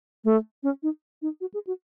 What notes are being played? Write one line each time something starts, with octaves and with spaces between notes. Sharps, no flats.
A3
C#4
D#4
D#4
F#4
G#4
F#4